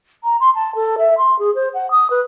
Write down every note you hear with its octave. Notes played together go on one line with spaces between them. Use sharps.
A#5
C6
A5
A4
E5
C6
G#4
C5
F#5
D#6
B4